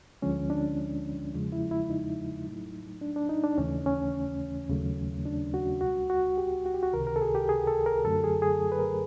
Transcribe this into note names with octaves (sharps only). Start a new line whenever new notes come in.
D2 D3 F3 G#3 C#4
D4
E2 C#3 F3 G#3
E4
E4
D#4
A2 F#3 A3
D4
D4
D#4
D4
D#2 C#3 E3 A3 C#4
C#4
D#2 C#3 F#3 A3
D4
F#4
C#2 B2 G3 F#4
F#4
G4
F#4
G4
F#4
C#2 C3 D#3 A#4
A#4
A4
G#4
G4
G#4
A4
A#4
F#2 D3 F#3 A3 A4
G#4
G#4
B4
A#4